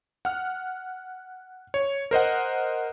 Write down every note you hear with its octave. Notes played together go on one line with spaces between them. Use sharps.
F#5 F6
C#5
A#4 C5 D#5 F#5